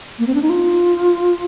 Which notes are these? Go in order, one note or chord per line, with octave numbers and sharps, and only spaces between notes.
A#3
C4
D4
D#4
F4